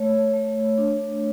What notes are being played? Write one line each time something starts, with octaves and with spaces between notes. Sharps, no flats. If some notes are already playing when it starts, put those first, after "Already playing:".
Already playing: A3 C#5
A3
D4